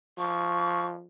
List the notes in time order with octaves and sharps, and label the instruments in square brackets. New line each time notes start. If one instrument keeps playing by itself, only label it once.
[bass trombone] F3 [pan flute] C#6